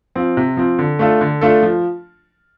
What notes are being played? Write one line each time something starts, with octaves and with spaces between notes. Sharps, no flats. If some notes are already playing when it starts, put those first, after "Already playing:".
F3 C4
C3
F3 C4
D3
A3 D4 F4 A4
D3
A3 D4 F4 A4
F3